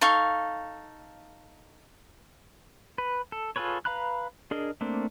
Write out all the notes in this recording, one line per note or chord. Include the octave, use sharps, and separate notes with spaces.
D#4 A4 F5 C#6
B4
A4
F4 G#4 A4 B4 C#5
B4 F5 A#5 B5 F#6
D4 G#4 A#4 D#5
A3 A#3 C4 D4